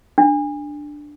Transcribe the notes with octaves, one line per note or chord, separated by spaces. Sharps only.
D4